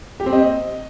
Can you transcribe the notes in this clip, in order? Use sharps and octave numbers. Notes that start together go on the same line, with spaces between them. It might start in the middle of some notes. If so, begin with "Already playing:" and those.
G4
C4
D#5